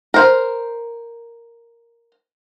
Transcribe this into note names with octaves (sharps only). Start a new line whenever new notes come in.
A#4 C5